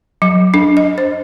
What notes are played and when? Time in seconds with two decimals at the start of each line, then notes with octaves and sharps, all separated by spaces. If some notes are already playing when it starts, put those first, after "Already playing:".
0.22 F#3
0.54 D4
0.77 D#5
0.98 C5